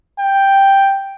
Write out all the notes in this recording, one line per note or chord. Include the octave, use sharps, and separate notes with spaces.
G5